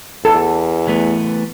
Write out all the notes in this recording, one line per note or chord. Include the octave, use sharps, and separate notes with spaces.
E2 A4
E3 A3 B3